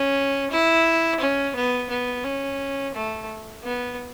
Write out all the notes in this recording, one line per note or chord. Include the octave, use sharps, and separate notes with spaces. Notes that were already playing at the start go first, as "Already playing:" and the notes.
Already playing: C#4
E4
C#4
B3
B3
C#4
A3
B3